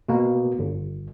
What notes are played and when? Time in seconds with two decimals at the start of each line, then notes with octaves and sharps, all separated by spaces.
0.09 B2 A#3
0.59 G1